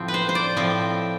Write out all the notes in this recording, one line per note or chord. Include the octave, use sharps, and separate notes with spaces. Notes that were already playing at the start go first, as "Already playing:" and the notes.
Already playing: A2 F3 C4
B4
C5
C5
D5
A2 F3 C4